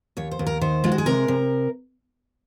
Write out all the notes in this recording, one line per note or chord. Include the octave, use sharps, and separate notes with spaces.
D#2 C#5
C5
D#2
A#4
D#3 C5
G#3 F4
F#4
G#4
C3 A#4
C3